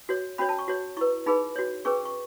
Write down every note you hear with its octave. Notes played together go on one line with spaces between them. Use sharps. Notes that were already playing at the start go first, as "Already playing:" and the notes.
F#4 C#5
C#4 F#4 C#5 B5
A5
C#6
F#4 C#5
E4 B4 C#6
D#4 G#4 B4 B5
F#4 C#5
C#4 G#4 B4 C#6
C#6